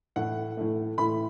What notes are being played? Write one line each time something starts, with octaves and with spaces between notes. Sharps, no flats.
A2 E3 A3 F#5
A2 E3 A3
A2 E3 A3 B5